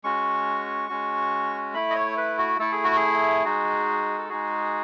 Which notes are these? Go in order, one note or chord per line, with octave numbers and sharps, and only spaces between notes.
G#3 C#4 F#4 C#6
G#3 C#4 F#4
A3 E4 B5
D#5
C#5
B4
F#4
A3 E4 A4
G#4
F#4
G#4
G#3 D#4 F#4
A4
G#3 D#4 F#4 G#4